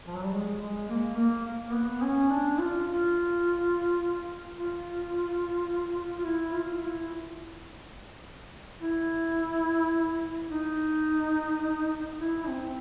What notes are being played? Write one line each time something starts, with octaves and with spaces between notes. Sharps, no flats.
F3
F#3
G3
G#3
G#3
A#3
A#3
A#3
B3
C#4
D4
F4
F4
F4
F4
E4
F4
F4
E4
E4
D#4
E4
C4